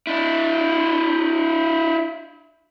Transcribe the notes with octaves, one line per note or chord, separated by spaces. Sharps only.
D4 E4